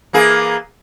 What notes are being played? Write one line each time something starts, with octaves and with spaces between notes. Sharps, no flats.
E3 A#3 G#4